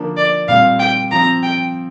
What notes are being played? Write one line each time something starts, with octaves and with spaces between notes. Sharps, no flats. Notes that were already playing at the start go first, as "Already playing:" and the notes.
Already playing: D3 F3 A#3 D4
D5
A#2 G3 C4 F5
G5
F3 C4 A#5
G5